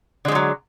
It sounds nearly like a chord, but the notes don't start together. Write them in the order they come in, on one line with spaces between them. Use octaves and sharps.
D3 G#3 F3 F#3